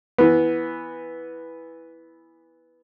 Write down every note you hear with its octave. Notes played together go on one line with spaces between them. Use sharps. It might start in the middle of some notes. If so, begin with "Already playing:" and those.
E3 B3